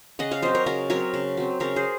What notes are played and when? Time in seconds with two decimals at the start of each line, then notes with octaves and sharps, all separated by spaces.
0.19 C#3 D#5 F#5
0.31 C#5 F5
0.42 F#3 C4 C5 D#5
0.55 A#4 C#5
0.66 C#3 F#4 A#4
0.90 F#3 C4 A#4 C#5
1.14 C#3
1.37 F#3 C4
1.60 C#3 A#4 C#5
1.76 G#4 C5